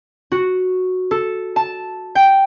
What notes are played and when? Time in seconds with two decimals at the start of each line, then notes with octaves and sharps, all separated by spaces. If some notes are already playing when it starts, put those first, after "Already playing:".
0.32 F#4
1.11 A4
1.56 A5
2.15 G5